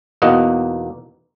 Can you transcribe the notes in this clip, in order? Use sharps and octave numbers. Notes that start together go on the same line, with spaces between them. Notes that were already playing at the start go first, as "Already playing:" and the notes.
E2 B2 A#3 D#4 D#5 F#5